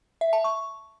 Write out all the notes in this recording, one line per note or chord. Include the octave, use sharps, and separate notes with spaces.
E5
A5
C#6